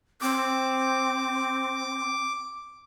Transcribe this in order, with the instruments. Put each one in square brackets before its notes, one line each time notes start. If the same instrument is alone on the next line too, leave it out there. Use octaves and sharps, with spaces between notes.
[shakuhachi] C4 [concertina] D6